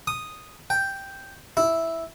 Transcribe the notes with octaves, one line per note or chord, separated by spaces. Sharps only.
D#6
G5
E4